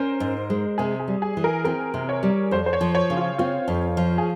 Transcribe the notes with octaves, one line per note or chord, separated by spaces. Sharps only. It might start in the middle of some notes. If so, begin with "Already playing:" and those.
Already playing: C#4 A#4 C5
G#2
G#3
C3 G#4
G#4
G3
G#4
E3
A#4
C4 A#4
C3
C#5
G3
F2 C5
C5
C#5
F3
C#5
C#3
F4
C4 F4
F2
F3
G#4